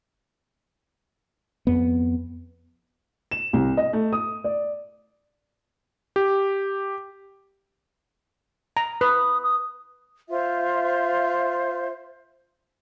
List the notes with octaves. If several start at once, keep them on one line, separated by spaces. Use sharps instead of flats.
F2 B3
E7
C2
D#5
A3
D#6
D5
G4
A#5
B4 D#6
D#6
F4 C5 E5